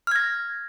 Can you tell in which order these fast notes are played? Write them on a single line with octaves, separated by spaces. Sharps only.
F6 G#6 A#6